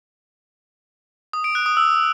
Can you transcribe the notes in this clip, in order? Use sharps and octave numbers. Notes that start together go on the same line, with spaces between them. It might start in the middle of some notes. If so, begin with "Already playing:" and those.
D#6
D7
F#6
D#6
E6